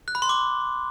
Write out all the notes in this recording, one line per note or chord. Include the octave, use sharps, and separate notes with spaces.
F#6
B5
C6
D6